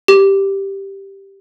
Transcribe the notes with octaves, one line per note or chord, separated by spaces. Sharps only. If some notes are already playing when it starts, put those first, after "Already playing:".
G4